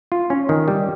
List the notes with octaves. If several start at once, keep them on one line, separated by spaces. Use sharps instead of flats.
F4
C#4
D#3
G3